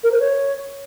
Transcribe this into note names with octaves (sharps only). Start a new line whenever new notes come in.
A#4
C5
C#5